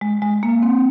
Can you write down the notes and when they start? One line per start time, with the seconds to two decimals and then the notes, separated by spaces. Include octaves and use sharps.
0.01 G#3
0.22 G#3
0.43 A#3
0.63 C4